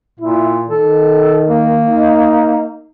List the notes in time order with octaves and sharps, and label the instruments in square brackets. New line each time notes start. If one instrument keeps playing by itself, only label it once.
[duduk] A#2 [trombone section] E4
[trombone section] D#3 [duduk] A4
[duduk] A#3
[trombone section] D#4